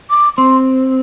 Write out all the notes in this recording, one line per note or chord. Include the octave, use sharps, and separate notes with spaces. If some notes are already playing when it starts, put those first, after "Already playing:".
D6
C4 C6